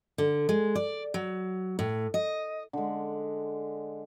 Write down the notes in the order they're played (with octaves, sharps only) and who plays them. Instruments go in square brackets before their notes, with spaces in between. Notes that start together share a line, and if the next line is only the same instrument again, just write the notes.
[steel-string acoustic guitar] D3
G#3
D5
F#3
A2
D#5
[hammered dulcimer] D3 G#3